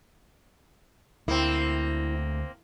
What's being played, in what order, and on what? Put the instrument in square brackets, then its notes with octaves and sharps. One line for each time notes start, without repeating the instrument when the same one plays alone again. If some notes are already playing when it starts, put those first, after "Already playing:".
[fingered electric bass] D2 [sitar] A#3 C4 [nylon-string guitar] E4